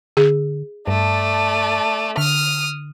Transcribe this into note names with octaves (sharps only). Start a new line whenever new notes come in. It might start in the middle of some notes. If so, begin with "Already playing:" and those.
D3 G#4
G2 A3 D5 A5
D3 D#6 F6